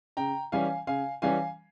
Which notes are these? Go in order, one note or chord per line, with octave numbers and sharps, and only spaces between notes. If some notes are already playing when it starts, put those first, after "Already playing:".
C#3 G5 A#5
E3 G3 C#4 F5 G#5
C#3 F5 G#5
E3 G3 C#4 F5 G#5